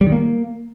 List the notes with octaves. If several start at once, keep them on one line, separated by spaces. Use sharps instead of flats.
G3
D#3
A#3